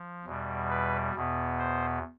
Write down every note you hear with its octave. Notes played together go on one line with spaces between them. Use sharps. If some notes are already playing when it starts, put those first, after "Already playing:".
Already playing: F3
E2 B2 G3
B4
E2 B2 B3
C5